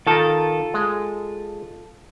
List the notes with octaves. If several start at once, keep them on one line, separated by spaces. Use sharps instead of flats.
D#3 F4 A4 A#4
G#3